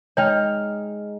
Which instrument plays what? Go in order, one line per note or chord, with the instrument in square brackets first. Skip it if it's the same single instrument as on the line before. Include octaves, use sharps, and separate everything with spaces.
[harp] G#3 D#4 F6 [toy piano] C#5 G5